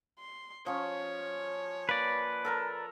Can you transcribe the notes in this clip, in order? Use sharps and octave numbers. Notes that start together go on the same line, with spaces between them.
C6
F3 C#4 C#5
A#3 B4 D5
A4 A#4 A#5